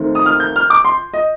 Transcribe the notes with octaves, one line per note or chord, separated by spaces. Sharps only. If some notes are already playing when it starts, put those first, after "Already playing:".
Already playing: D#2 D#3 A3 C4
D#6
F6
G6
F6
D6
C6
D#5